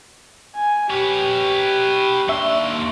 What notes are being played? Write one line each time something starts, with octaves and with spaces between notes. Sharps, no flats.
G#5
G4 B4 C#5
D#2 D4 E5 C6 C#6
A#3